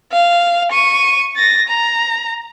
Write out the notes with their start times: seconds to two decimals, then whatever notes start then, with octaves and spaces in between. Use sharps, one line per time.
0.12 F5
0.72 C#6 D#7
1.37 A6 A#6
1.69 A#5